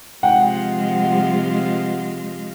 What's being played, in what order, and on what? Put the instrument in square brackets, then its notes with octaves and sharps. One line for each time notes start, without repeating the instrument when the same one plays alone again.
[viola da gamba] C3 F3 F4 [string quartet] G#3 [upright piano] F#5 G5